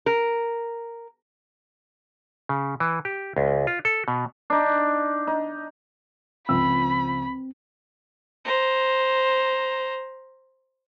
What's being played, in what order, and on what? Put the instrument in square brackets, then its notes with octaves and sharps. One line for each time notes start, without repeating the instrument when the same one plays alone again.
[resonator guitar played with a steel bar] A#4
[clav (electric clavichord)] C#3
E3
G4
C#2
F4
A4
B2
[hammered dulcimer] D4 D#4
D#4
[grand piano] C#2 F3 E6 [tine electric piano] C4 [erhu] B5
[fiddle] C5 A#5